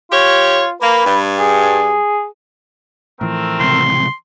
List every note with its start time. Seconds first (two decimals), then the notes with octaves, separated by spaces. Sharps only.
0.12 F4 G4 C#5
0.82 A#3 B4
1.05 G2
1.39 G#4
3.21 A2 E3 F3 A3 C4 A#4
3.60 C#2 C3 C6